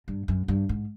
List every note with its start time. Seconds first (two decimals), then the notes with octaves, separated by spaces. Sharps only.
0.08 G2
0.28 F#2
0.48 G2
0.69 G#2